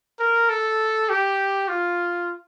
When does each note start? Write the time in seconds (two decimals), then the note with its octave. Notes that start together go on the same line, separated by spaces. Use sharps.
0.19 A#4
0.49 A4
1.09 G4
1.68 F4